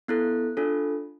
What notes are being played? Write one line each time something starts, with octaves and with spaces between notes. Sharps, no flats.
B3 E4 A4 F#6
D4 F4 A4